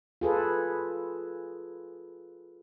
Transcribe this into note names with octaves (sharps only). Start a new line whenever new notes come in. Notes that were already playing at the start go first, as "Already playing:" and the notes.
F4 G#4 A4 B4